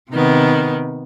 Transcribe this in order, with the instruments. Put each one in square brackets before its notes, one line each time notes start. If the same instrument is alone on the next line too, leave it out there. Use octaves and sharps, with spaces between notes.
[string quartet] C3 D#3 B3